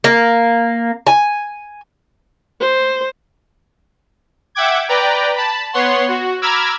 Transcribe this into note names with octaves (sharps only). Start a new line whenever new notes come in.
A#3
G#5
C5
E5 F#5 G5 D6 G#6
B4 D5 G5 A#5
A5 B5
B3 C#5 F#5 C6
F#4
A#5 B5 D6 E6 F6 G#6